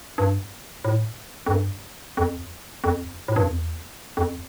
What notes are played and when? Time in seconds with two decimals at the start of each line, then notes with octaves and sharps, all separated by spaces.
0.18 G2
0.85 A2
1.46 F2
1.50 G2
2.17 F2
2.84 F2
3.28 A2
3.36 G2
3.43 F2
3.50 E2
4.17 F2